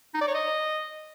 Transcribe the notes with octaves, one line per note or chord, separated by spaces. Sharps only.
D#4
D5
C#5
D#5